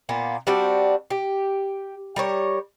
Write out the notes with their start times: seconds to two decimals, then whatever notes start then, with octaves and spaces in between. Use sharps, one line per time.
0.09 A#2 A#3 B3
0.47 G3 C4 D4 F#4
1.10 G4
2.16 G3 A#4 C#5